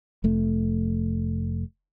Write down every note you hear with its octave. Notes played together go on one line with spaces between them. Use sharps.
F1 A3